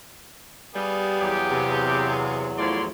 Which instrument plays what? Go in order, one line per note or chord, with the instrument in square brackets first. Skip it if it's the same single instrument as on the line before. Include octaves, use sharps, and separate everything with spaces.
[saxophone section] G3 [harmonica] B3 G#4 F5
[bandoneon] E2 F#3 [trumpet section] G4
[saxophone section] C3
[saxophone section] A2 F3 [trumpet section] C#5 D5 C6